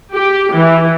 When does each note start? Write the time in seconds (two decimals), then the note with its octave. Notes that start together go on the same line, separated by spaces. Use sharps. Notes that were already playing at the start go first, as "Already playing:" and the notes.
0.13 G4
0.54 E3